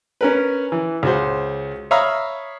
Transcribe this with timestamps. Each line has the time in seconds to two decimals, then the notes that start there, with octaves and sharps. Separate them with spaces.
0.21 C#4 A#4 B4
0.72 E3
1.03 C#2 F#4 C5
1.91 C#5 E5 F5 A#5 B5 D#6